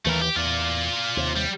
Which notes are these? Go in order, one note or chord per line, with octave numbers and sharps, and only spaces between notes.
D#2 E3 A3 A#4
G4
E2 F4 D5
D#2 C3
G3